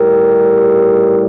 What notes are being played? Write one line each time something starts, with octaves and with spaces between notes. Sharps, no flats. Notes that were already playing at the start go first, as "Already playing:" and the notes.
Already playing: A2 G3 G4 A#4